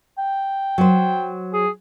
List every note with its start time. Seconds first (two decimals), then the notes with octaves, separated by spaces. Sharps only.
0.18 G5
0.78 F#3 C5
1.53 G#4